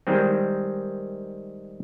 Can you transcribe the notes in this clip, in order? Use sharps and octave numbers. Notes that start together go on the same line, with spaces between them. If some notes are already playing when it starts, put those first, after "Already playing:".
D#3 G3 G#3 C4